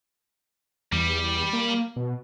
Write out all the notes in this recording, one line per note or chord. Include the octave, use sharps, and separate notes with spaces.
E2 G3
A#3
B2